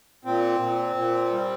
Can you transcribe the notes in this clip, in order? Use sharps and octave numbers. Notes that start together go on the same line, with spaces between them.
A#2 C4
A#2
A#2
G3